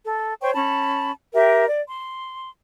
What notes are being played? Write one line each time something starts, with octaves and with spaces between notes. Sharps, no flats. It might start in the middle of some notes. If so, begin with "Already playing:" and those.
A4
C5 C#5 G5 C#6
C#4 A5 B5
G4 A#4 E5 G5
D5
C6